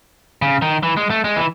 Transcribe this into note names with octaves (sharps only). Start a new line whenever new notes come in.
C#3
D#3
E3
G#3
A3
G#3
E3